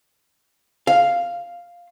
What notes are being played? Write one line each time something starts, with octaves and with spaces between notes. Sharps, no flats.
F5